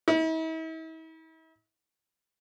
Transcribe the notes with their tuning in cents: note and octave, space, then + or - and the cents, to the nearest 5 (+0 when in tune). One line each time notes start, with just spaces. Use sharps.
E4 -45